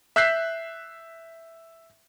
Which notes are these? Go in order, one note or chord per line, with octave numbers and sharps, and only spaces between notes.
E5 E6 F#6 G6 B6 C7